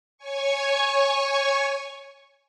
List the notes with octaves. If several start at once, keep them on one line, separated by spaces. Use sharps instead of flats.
C#5 G#5 C#6